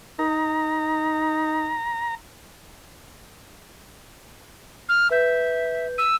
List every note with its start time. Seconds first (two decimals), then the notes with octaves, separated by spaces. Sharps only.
0.19 D#4 A#5
4.89 F6
5.10 B4 E5 G6
5.98 E6 D#7